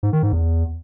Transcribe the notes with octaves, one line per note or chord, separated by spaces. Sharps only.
G#2
D#3
G#2
E2